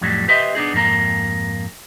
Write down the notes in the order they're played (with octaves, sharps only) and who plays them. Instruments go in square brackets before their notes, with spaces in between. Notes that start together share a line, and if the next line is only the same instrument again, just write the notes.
[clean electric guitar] F2 A2 F#3 G3
G4 B4 C5 D#5 E5
B3 D4 D#4 G#4
F2 G#2 A#3 A#5